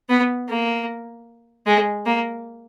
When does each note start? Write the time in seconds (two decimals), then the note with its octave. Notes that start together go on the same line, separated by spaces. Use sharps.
0.09 B3
0.49 A#3
1.66 G#3
2.06 A#3